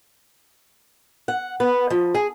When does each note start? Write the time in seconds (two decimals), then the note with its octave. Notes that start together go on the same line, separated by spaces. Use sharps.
1.28 F#5
1.60 B3
1.90 F3
2.14 G#4